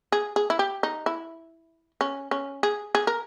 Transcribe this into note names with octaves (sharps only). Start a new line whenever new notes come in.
G#4
G#4
E4
G4
D#4
E4
C#4
C#4
G#4
G#4
A#4